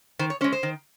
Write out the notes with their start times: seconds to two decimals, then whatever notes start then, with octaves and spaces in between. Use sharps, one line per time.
0.19 D#3 C5
0.30 C#5
0.41 G#3 C#4 C5
0.53 C5
0.63 D#3